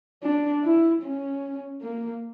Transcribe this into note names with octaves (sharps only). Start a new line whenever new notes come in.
D4
E4
C#4
A#3